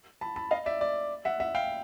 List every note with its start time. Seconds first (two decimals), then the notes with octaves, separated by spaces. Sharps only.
0.21 A5 B5
0.36 A5 B5
0.51 D#5 F5
0.66 D5 E5
0.81 D5
1.25 E5 F#5
1.40 E5 F#5
1.55 F5 G5